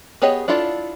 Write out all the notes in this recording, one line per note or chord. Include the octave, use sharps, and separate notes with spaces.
B3 G4 G#4 C#5 D#5
D4 E4 F4 A4 D5